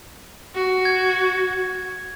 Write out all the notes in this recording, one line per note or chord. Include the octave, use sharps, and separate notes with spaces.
F#4
G#6